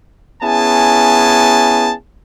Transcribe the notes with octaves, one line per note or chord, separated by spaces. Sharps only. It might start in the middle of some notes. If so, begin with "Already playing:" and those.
B3 C#4 E4 G#4 G#5 A5